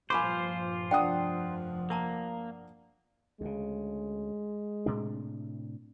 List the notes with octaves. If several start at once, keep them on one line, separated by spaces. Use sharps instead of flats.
G2 A#2 F3 F4 C5 G#5 B5 D6
F1 G2 F3 D4 F#5 G5 D#6
A#3 A#4 A5 A#5
D2 C#3 G#3
A2 C3 D4